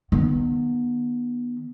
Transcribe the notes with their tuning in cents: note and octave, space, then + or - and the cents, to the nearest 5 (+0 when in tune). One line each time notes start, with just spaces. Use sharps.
D#3 -40 B3 -25